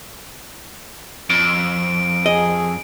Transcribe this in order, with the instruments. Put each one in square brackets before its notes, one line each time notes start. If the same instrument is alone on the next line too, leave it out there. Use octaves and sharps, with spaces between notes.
[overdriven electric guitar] F2 [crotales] D7
[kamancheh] G#4 [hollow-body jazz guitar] D#5